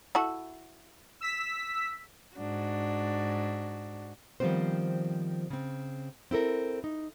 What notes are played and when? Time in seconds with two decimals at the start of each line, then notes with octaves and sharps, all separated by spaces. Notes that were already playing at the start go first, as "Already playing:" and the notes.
0.15 E4 F#4 A4
1.21 E6 B6
2.37 G#2 D4 F#4
4.40 D#3 F3 G3 B3 C4 C5
5.50 C#3 C4
6.31 C4 E4 A4 A#4
6.84 D#4